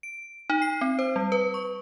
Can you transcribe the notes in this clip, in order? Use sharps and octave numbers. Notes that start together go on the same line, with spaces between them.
D7
D#4
C7
C4
C5
G3
B4
C#6